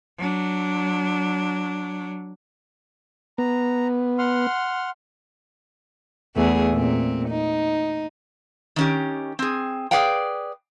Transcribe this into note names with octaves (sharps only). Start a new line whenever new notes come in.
F#3 D4
B3 A#5
F#5 C6 F6
E2 A3 G#4
A#2 C4
D#4
D#3 C#4 G4
C4 G#4
G#4 B4 D5 F5 G5